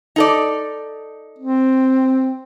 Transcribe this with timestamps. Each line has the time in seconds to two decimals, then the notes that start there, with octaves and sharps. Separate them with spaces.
0.16 D#4 A4 D5
1.39 C4